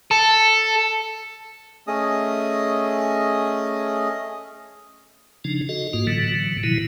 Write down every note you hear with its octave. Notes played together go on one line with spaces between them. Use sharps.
A4
A3 C#4 G#4 D#5 D#6
C#3 F3 D4 D#4
F#4 A4 D#5
G#2 A#3 F4 F#4
A2 D3 E3 F#3
B2 D#3 F3 F#3 E4